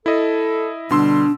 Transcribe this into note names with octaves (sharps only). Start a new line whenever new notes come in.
E4 A4 D#5
B2 D3 G3 D4 C6 E6